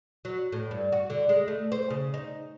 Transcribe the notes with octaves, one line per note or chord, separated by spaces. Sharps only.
F#3
A2
G2
F#4
D3
G#3
A3
C5
C#3
D#4